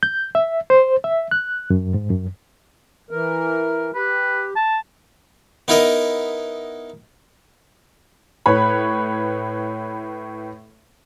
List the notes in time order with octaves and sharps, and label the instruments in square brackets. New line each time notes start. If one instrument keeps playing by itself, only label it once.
[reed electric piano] G6
E5
C5
E5
F#6
F#2
G#2
F#2
[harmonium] E3 A#4
[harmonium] G4 [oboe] B4
[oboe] A5
[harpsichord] B3 D#4 E4 A#4 D#5
[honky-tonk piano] A2 B4 C#5 B5